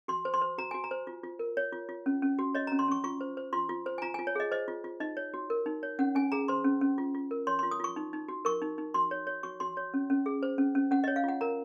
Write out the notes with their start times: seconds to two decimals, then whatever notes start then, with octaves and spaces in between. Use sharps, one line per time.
0.08 F#4 C6
0.25 C5
0.34 C6
0.41 C5
0.58 F#4 A#5
0.71 F#4 G#5
0.84 A#5
0.91 C5
1.07 F4
1.24 F4
1.39 A#4
1.57 C#5
1.73 F4
1.89 F4
2.06 C#4
2.22 C#4
2.39 F#4
2.55 C#5 D#5
2.67 C#4 A#5
2.79 C6
2.88 C#4 C#6
3.04 F4 C#6
3.21 C5
3.37 C5
3.53 F4 C6
3.69 F4
3.86 C5
3.98 G#5
4.02 F4 A#5
4.14 F4 G#5
4.27 C#5
4.35 G#4 D#5
4.52 C5 D#5
4.68 F4
4.84 F4
5.00 D#4 D#5
5.17 C#5
5.34 F#4
5.50 A#4
5.66 D#4
5.83 C#5
5.99 C#4 F#5
6.15 C#4 G#5
6.32 G#4 A#5
6.48 C5 C6
6.64 C#4
6.81 C#4
6.98 F4
7.14 F4
7.31 A#4
7.47 C#5 C6
7.59 F4 C6
7.71 D#6
7.80 F4 C#6
7.96 D#4
8.13 D#4
8.28 F#4
8.45 A#4 C#6
8.62 D#4
8.78 D#4
8.94 F#4 C6
9.11 C#5
9.27 C#5
9.43 F#4 C#6
9.60 F#4 C6
9.77 C#5
9.94 C#4
10.10 C#4
10.26 G#4
10.43 C5
10.58 C#4
10.75 C#4
10.91 C#4 F#5
11.04 C#5 D#5
11.16 F5
11.24 F4 F#5
11.41 A#4 A#5